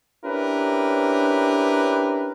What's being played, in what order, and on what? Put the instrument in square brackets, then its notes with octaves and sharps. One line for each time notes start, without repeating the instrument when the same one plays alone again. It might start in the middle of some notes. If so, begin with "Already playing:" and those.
[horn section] C#4 D4 E4 G4 A#4 B4